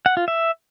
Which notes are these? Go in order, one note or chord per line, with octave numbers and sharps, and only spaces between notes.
F#5
F4
E5